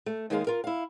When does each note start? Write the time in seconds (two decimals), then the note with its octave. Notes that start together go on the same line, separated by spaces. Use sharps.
0.06 A3
0.30 D#2 D#3 G#3 A#3 G#4 F5
0.47 F4 A#4
0.64 E4 F5